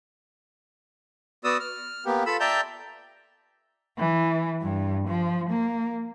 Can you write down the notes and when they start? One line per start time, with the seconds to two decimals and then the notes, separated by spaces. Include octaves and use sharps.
1.44 B3 F#4 D5 D#6 E6
1.60 F6
2.06 A#3 B3 G4
2.26 F4 A4 B5 E6
2.40 D5 E5 G5 A5 A#5 G6
3.98 E3
4.62 G2
5.08 F3
5.50 A#3